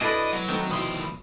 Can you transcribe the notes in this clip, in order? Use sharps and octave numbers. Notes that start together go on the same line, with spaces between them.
B2 D4 E4 A4 B4 D#5 G#5 B5
F#3
D#3 A3 C4 A4
D2 B2 F3 E4 B5 C6 D#6